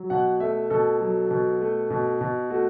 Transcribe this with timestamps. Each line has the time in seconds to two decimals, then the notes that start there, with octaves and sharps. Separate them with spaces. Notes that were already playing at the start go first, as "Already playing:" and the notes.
Already playing: F#3
0.10 B2 F#5
0.40 A3 E5
0.70 B2 A4
1.01 F#3
1.31 B2
1.61 A3
1.90 B2
2.21 B2
2.50 A3 F#4